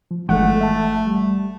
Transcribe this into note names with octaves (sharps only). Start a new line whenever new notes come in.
F3
G1 E3 F3 G#3 A3 A4 F#5
E5 A5
G3